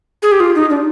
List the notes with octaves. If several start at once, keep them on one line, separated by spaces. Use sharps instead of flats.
G#4
G4
F4
D#4
D4